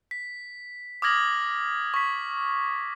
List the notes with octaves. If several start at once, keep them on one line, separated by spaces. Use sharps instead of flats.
B6
D6 D#6 F6 G#6 A#6 F#7
C#6 B6